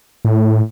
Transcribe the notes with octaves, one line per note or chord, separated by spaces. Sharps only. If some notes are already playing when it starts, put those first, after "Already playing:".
A2